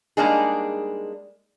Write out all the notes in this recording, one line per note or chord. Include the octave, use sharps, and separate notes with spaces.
G3 G#3 A#3 D4 D#4 G#4